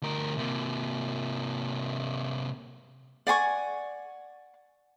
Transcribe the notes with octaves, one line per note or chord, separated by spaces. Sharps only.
D2 A#4
C3 A#3
D5 F#5 G#5 C#6